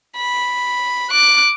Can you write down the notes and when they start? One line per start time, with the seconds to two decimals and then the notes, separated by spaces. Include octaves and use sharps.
0.18 B5
1.11 D6 F#6